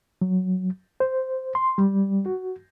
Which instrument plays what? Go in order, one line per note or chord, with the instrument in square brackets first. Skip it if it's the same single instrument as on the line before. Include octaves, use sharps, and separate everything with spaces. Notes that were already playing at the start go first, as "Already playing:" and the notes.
[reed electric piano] F#3
C5
C6
G3
F#4